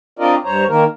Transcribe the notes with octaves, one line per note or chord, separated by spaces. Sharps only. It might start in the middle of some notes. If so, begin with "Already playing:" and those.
C4 D4 F4 A#4 D5 D#5
G2 C5 C#5 A#5
D#3 A#3 A#4